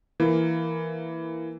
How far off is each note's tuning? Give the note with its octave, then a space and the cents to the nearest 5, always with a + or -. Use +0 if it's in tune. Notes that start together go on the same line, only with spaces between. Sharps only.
E3 +0 A#3 +0